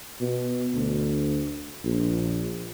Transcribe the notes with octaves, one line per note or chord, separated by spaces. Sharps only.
B2
D2
A#1